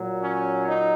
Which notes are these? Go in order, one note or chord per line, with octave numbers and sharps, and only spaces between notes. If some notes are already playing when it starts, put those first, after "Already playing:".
Already playing: A#2 F#3
C#4
D#4